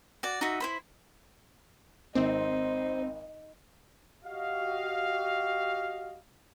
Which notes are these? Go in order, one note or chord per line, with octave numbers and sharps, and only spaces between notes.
F#4 D5
D#4 F#4 E5
E4 C5 B5
G#1 C4 D#4 C5
F#4 G4 D#5 F5